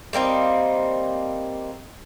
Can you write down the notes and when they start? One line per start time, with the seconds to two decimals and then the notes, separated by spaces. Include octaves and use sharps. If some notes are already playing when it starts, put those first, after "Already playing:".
0.13 G3 A#3 C4 D#4